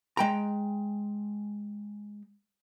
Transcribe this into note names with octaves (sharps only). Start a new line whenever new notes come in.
G#3 G5 A#5